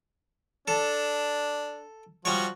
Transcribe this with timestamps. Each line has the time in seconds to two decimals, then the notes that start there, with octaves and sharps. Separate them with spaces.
0.68 D4 A4
2.25 F3 G3 F#4 C#5